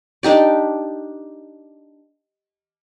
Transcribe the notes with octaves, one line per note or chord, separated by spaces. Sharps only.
D4 D#4 G4 D5